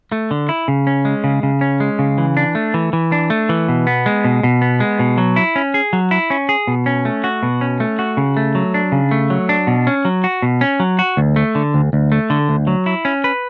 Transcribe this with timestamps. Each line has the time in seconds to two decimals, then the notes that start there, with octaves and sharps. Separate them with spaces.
0.12 A3
0.31 D3
0.49 E4
0.68 C#3
0.87 C#4
1.05 G#3
1.24 C#3
1.43 C#3
1.61 C#4
1.80 G#3
1.99 C#3
2.18 E3
2.37 D4
2.55 A3
2.74 E3
2.93 E3
3.12 D4
3.30 A3
3.49 E3
3.68 B2
3.87 B3
4.06 G#3
4.24 B2
4.43 B2
4.62 B3
4.80 G#3
4.99 B2
5.18 F#3
5.36 E4
5.56 C#4
5.74 G#4
5.93 F#3
6.11 E4
6.30 C#4
6.49 G#4
6.67 B2
6.86 C#4
7.05 A3
7.24 F#4
7.43 B2
7.61 C#4
7.80 A3
7.99 F#4
8.17 C#3
8.37 A3
8.55 F#3
8.74 D4
8.92 C#3
9.11 A3
9.30 F#3
9.49 D4
9.67 B2
9.87 C#4
10.05 F#3
10.24 F#4
10.42 B2
10.61 C#4
10.80 F#3
10.99 F#4
11.17 D2
11.36 A3
11.55 D3
11.74 D2
11.93 D2
12.12 A3
12.30 D3
12.49 D2
12.67 F#3
12.86 E4
13.05 C#4
13.24 B4